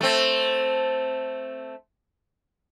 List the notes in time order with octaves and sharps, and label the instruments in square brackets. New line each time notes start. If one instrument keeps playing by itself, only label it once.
[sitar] A3 C4